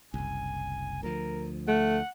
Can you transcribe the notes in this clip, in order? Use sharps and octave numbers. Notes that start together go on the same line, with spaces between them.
F#1 C2 G#5
D2 F3 A#4
A3 F#5